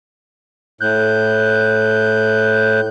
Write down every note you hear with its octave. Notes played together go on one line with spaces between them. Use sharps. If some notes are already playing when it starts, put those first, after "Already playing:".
A2 F#6 G6